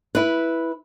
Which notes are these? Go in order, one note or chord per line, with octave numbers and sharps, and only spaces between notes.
E4 B4